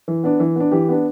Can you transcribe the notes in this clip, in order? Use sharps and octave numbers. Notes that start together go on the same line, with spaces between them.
E3
B3 D4
E3
B3 D4
E3 G4
B3 D4